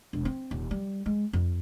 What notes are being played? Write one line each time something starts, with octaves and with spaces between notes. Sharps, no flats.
E1
C4
D#1
G3
G#3
F2